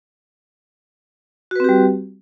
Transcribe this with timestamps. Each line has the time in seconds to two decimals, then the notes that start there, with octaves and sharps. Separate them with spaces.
1.51 F#4
1.56 B4
1.60 C4
1.64 G4
1.69 G3